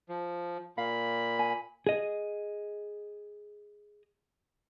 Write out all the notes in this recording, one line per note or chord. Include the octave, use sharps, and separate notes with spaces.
F3
A#2 F5 B5
G#5
G#4 D#5